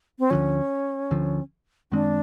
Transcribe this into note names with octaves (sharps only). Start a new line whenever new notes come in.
C4
D2 D3 F3 C#4
D2 D3 F3
F#2 D#3 G#3 C4 D4